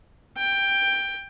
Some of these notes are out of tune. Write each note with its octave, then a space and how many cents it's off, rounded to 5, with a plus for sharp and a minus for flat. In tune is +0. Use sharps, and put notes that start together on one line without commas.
G5 +10